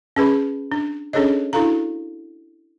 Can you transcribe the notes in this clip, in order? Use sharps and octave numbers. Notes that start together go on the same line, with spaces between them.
C#4 G#4 B4 B5
D4
C#4 D4 G#4 A4 C#5 D#5
D4 E4 F#4 A4 F5 A#5